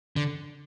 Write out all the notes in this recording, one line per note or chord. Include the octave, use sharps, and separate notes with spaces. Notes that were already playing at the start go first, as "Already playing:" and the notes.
D3